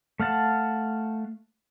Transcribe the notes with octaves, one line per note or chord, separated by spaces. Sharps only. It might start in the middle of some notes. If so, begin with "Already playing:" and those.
A3 F5 F#5 A5